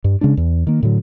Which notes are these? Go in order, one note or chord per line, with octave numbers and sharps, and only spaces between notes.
G2
C#3 G#3 C#4 D4
E2
D#3 A#3
A2 D3 F#3